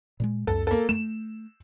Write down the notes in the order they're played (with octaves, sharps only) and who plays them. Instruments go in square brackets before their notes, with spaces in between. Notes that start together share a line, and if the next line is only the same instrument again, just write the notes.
[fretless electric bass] A#2 G3 G#3
[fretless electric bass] C#2 F#2 [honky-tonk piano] A4
[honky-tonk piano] A#3 A4
[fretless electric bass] A3 [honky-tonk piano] E7